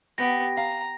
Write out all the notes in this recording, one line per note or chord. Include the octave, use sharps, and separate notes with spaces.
B3 G4 G5 A#6
F5 A#5